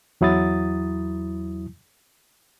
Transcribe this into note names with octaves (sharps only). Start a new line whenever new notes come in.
E2 F#3 E4 D#6 A6